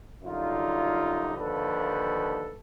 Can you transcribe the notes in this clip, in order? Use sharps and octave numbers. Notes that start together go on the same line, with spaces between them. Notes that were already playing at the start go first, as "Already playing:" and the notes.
F#2 D3 G3 D#4 F4
D#2 D3 F3 A4 B4